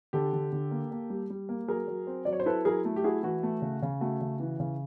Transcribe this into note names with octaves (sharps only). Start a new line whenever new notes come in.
D3 G4 A4
D3
D3
A#3
A#3
G3
G3
A#3
F#3 G#4 A#4
F#3
C4
F#3 D5
C#5
C5
E4 A4 B4
F#3 G#4 A#4
A3
G4
E4 F#4 G#4
E3 F#4
A3
C#3
C#3
A3 F#4
C#3
E3
C#3